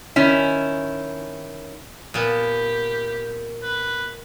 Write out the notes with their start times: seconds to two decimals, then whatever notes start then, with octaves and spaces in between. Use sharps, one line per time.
0.16 D#3 C#4 E4
2.14 A#2 B3 G4 A5
3.63 B4